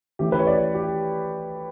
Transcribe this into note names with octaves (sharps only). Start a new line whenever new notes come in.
E3 A3 C#4 G4
B4
C#5
D5
G4